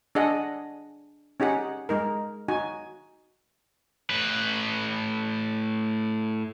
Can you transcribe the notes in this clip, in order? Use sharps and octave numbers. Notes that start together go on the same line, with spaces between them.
D4 G#4 D#5 F#5
C#4 D#4 G4 G#4 F#5
G#3 D#4 A#4
D#4 F#4 G#5
A2 B4